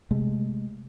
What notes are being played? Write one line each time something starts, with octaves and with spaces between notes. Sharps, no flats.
C3 G#3 A3